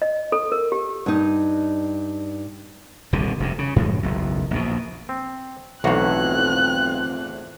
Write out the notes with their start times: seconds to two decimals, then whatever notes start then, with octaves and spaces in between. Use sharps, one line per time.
0.02 D#5
0.32 A4
0.52 A#4
0.72 G4
1.06 G2 D#4
3.13 D#1 C2 B2 D3
3.40 F1 F#2 C3
3.58 C#3
3.76 F#2 A2 F3 G#3
4.02 F#1 B1 E2
4.51 A#1 D#2 B2
5.09 C4
5.84 B1 E2 A2 F3 C4 F#4 F#6